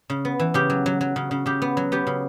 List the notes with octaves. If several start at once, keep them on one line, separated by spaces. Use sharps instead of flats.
C#3
B3
E3
C#3 G4
F#3
F#3
F#3
C#3
C#3
C#3 G4
B3
F#3
B3 G4
C#3